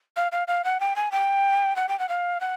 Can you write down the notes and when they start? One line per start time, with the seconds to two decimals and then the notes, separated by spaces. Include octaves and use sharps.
0.16 F5
0.32 F5
0.48 F5
0.64 F#5
0.80 G5
0.96 G#5
1.12 G5
1.76 F#5
1.89 G5
1.99 F#5
2.09 F5
2.41 F#5